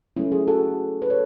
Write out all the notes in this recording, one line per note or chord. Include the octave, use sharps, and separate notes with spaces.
C#3 F#3 A3 C#4 E4
E4 G#4
F#4 A4
B4
A4 C#5